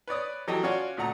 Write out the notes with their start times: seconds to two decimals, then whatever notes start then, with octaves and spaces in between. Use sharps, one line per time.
0.08 B4 C#5 D5 D#6
0.48 E3 F#3 G4 A4 D#5
0.63 C#4 F4 F#4 C#5 D5
0.97 D2 A#2 A3 F#5 A#5